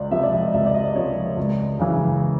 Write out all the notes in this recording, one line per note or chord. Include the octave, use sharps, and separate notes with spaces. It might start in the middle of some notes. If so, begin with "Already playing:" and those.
Already playing: C#2 D5
C3 F3 E5
D5
D#5
C#2 E5
D5
D#5
C3 F3 C#5
C#2
C#3 E3